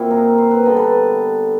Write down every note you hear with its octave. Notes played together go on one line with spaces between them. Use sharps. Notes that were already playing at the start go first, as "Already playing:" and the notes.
Already playing: A#2 C4 E4 F#4
G#4 A#4
C5
B4
D3 G3 B3 A#4
A4 B4